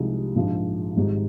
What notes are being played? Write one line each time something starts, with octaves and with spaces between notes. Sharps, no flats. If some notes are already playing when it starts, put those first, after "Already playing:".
Already playing: C2 C3 F3 G#3 D#4
A#1 G#2 F3
G#1 G#2 G3